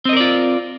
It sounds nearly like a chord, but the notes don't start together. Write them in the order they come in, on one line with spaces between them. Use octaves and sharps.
C4 D#5 A#4 D5 F4